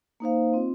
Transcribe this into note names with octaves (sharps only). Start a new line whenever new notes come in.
A#3 D#4 C5 F5
C4 F4 D#5